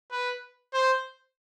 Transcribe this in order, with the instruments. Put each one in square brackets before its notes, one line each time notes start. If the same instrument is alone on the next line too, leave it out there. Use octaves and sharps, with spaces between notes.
[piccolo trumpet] B4
C5